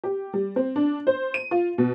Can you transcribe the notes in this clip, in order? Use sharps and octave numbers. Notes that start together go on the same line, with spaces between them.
G4
G3
C4
D4
C5
D#7
F4
B2